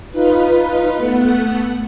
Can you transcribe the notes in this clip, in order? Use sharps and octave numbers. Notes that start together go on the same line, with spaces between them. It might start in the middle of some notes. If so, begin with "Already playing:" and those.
D#4 F4 B4
A3 B3 F#5